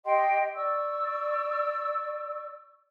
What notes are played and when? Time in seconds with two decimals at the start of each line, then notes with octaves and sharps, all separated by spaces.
0.05 G4 D#5 G5 C6
0.55 D5 C#6 E6